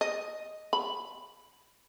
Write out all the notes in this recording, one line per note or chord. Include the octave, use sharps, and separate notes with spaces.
D#5
B5